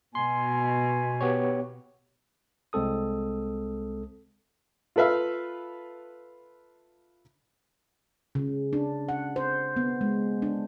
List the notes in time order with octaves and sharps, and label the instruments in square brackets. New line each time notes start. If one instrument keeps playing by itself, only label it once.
[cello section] B2 [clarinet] G#5 [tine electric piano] C6
[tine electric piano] B3 G4 C#5
C2 G#3 C4 A4 D#6
[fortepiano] F4 A4 B4 E5 F5
[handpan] C#3
D4
F#5
C5
B3
G#3
D4